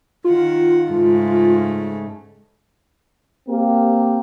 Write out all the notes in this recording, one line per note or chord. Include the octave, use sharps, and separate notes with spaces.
D#3 F4 F#5
G#2 C#3 A3
A#3 C4 G4